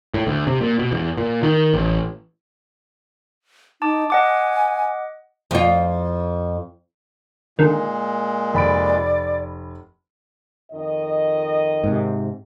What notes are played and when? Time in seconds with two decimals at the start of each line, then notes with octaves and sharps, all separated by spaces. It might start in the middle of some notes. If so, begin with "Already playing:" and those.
0.14 A2
0.27 D2
0.47 C3
0.61 A#2
0.79 B2
0.92 E2
1.18 A#2
1.43 D#3
1.74 A1
3.82 D#4 A5 D6
4.10 D#5 F#5 G#5 D6
5.51 F2 F4
7.59 A#2 D3 D#3 G#3
8.54 F1 D5 B5 D7
10.72 F2 D#3 D#5
11.84 G#2 C3